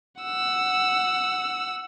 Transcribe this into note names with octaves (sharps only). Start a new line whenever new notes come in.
F#5 E6